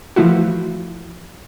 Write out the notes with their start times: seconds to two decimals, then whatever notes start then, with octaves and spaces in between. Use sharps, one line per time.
0.16 E3 F3 A3 E4 F#4